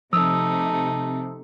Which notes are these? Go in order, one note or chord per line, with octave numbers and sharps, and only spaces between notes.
C3 F3 A3 D#4 D#6 E6